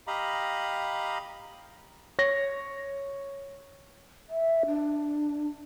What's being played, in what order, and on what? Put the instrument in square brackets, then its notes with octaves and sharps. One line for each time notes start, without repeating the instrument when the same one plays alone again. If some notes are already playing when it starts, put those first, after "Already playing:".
[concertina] G4 D#5 F5 A#5 B5
[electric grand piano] C#5 A#6
[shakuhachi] E5
D4